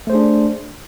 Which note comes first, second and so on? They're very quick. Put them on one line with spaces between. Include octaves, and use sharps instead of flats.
A3 C5 G#4 D4